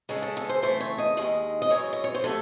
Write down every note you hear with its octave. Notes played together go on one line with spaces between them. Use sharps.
C#3 G#3 C#4 A4
A4
A4
C5
C#3 E3 A3 C4 C5
C#5
D#5
D#2 D#3 G#3 D#5
D#5
F#2 E3 G#3 C#5
D#5
C#5
C5
C3 F#3 A3 A4